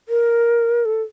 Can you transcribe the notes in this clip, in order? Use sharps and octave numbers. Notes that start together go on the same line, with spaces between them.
A#4
A4